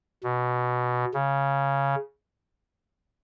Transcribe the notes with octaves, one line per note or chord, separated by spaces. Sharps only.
B2
C#3